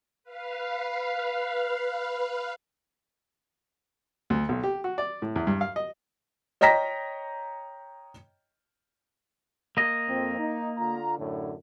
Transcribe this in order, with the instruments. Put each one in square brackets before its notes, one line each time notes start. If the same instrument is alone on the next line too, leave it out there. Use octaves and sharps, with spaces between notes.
[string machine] B4 F5
[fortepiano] D2
B1
G4
F#4
D5
A2
E2
G2
F5
D#5
[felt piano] C#5 D#5 G5 A#5 A#6 B6
[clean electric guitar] A#3 D#5
[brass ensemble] F2 C4
D#4
D3 F4 A#5
F#2 A2 D3